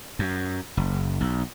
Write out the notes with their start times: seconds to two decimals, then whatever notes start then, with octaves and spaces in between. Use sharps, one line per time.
0.19 F#2
0.77 F#1
1.21 B1